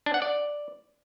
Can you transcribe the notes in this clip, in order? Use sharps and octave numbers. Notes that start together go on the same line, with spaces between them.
D4
F#5
D5